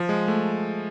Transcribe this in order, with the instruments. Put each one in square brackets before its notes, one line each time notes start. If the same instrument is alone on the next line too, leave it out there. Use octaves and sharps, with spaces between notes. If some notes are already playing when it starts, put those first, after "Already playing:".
Already playing: [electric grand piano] F3
G#3
A3